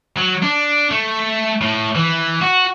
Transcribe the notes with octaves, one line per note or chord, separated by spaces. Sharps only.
F#3
D4
A3
A2
E3
F#4